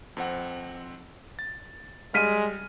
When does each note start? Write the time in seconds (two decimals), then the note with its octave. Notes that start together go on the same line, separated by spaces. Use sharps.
0.17 F2 C4 F#5
1.39 A6
2.14 G3 G#3 F6 B6 D#7